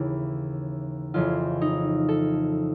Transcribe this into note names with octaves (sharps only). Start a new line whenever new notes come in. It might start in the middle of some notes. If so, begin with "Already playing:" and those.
Already playing: D#2 C#3 E3 E4
F2 C#3 E3 F4
D#4
A4